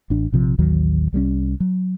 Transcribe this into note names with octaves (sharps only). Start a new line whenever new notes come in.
A1 D4
A#1 C3 F3
A1 D#2 D#3 F#3
C2 G3 G#3 C#4
F#3